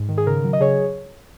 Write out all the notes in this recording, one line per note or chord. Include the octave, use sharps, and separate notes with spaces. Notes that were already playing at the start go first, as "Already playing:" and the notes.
Already playing: G#2
D#3
G#4
C#3 A#4
F#3
D#5
C#3 G#4 C#5